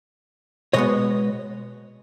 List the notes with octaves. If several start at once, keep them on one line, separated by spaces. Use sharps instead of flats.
B2 G#3 B3 C#5 D#5